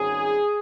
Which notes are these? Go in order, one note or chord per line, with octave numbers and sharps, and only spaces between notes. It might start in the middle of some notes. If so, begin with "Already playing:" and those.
Already playing: G#1 G#2 G3 C#4 G#4